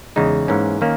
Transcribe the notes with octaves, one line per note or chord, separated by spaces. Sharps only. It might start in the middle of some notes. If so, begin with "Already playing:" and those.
E2 C#3 G#3 D#4
G#2 E3 A#3 C#4
D#3 A#3 C#4